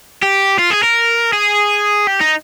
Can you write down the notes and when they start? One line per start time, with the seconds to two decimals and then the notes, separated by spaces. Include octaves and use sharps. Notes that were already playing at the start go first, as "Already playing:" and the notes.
0.22 G4
0.59 F4
0.71 G#4
0.84 A#4
1.33 G#4
2.07 G4
2.20 D#4